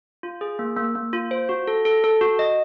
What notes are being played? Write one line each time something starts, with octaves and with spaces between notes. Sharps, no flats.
F4
G#4
A#3
A#3
A#3
F4
C5
F#4
A4
A4
A4
F#4
D#5